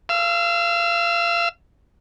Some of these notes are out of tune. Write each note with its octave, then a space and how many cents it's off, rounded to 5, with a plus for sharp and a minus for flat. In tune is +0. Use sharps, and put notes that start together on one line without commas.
F5 -30 E6 +0